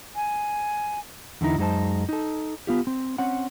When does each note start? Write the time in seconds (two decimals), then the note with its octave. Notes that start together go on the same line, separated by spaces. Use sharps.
0.15 G#5
1.41 E2 D3 A3 D#4 E4
1.58 F#2 G#3 D#4 C5 A5
2.09 D#4 A4
2.67 B3 F4 G4
2.87 C4
3.18 C4 C#4 F#5